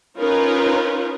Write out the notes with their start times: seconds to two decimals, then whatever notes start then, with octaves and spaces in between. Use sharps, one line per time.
0.17 C#4 D#4 F4 A#4 B4 C#5